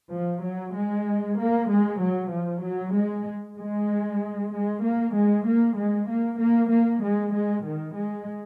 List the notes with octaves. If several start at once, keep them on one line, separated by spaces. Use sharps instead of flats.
F3
F#3
G#3
A#3
G#3
F#3
F3
F#3
G#3
G#3
G#3
A#3
G#3
A#3
G#3
A#3
A#3
A#3
G#3
G#3
D#3
G#3